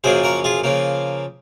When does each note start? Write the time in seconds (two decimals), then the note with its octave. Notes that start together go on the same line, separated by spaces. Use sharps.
0.04 F#2 C#3 F3 A#3 G#4 C5
0.24 F#4 A#4
0.44 F4 G#4
0.64 C#3 F3 A#3